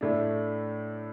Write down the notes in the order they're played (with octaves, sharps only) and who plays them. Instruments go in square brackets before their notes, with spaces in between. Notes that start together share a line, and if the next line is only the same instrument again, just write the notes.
[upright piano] A2 A3 D4